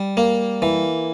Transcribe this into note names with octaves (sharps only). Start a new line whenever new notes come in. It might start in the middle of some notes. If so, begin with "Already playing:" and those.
Already playing: G3
A#3
E3